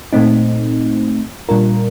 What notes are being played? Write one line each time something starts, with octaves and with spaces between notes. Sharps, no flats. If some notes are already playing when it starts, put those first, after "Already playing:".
A#2 A3 C4 D#4
A#2 G3 D4 F4 A#4